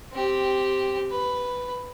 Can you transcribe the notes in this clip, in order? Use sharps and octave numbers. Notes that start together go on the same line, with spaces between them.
C4 G4
B4